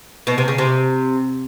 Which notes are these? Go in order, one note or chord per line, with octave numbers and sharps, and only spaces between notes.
B2
C3
C#3
C3